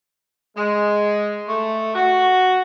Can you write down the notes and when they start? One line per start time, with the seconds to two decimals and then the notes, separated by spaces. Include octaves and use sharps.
0.56 G#3
1.49 A3
1.95 F#4